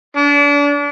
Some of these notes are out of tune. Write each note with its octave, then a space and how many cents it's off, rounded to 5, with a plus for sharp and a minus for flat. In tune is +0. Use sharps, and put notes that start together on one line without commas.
D4 -35